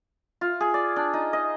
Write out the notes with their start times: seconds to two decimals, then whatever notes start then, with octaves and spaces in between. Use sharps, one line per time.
0.41 F4
0.60 G#4
0.74 D5
0.96 D4
1.13 D#4
1.33 D#5